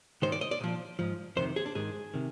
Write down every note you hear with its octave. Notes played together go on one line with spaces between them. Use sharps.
G#2 D#3 C5
D5
D#5
D5
A#2 F3
G#2 F3
F2 C3 D#3 C5
G#4
D4
G#2 D#3 G#4
C3 D#3